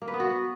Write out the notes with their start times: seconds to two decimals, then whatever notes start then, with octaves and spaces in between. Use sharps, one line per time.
0.02 A#3
0.08 B4
0.14 B3
0.20 F#4